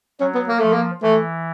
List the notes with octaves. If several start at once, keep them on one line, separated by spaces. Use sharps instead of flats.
F#3 C#4
B3
A#3
F3 A3
A#3
E3 A3